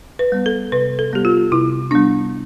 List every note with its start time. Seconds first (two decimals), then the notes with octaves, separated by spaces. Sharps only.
0.19 B4
0.32 G3 B3
0.46 A4
0.72 C3 B4
0.99 A4
1.12 G3 B3 G4
1.25 F4
1.52 C3 E4
1.91 G3 B3 D4